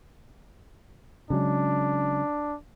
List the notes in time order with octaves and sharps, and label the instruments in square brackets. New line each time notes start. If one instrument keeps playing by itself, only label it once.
[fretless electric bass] C#3 F#3 G#3 [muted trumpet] D4